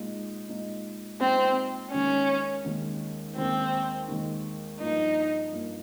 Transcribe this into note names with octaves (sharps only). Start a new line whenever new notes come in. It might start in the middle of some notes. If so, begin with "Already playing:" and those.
Already playing: A#2 G#3 D#4
A#2 G#3 D#4
A#2 G#3 C4 D#4
D#2 D#3 G#3 C#4
D#2 D#3 G#3
D#2 D#3 G#3 C4
D#2 D#3 G#3
G2 F3 A#3 D#4
G2 F3 A#3